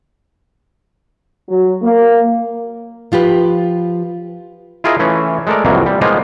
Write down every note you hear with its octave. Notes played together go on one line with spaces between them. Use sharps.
F#3
A#3
F3 F4 G4 B4
E4 F4 G#4 A#4 D#5 E5
E3 A3 C#4
G#3 A3 A4 A#4 D5
C2 F2 C3 E3 F#3 A#3
G3
F3 G#3 A#3 B3 D#4 F4